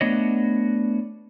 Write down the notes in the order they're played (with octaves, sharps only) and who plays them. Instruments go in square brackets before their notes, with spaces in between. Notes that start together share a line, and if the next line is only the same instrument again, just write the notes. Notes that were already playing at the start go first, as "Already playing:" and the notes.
[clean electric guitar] A3 B3 D4 F#4 C#5 D#5